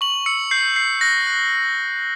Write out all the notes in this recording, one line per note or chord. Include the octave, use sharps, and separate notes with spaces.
C#6 F#7
E6 C#7
G6 C7
G6 C7
F#6 A#6
F#6